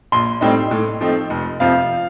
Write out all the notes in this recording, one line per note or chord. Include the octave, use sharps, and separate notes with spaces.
A#1 C6
A2 G3 C4 D#4
A2
F3 A3 C4 D#4
F1
F2 C3 F3 F5